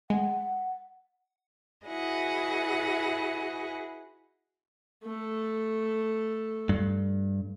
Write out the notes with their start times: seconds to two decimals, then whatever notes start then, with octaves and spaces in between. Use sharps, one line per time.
0.10 G#3 F#5
1.86 E4 F#4 G#4 B4 D#5 F#5
5.03 A3 A4
6.69 G2